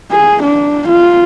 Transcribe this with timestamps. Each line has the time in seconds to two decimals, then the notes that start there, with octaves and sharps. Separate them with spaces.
0.12 G#4
0.43 D4
0.89 F4